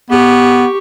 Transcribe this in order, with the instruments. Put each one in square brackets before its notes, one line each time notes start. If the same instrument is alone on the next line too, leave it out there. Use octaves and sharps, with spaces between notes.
[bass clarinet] B3 [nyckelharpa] G4 C#6